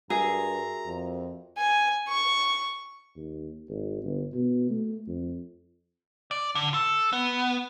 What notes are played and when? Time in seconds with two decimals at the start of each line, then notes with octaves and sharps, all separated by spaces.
0.10 G2 F#4 G#4 A#4 E5 A#5
0.86 F2
1.58 G#5
2.08 C#6
3.17 D#2
3.69 G#1
4.03 G1
4.33 B2
4.70 A3
5.08 F2
6.31 D5
6.55 D3
6.74 A4
7.13 B3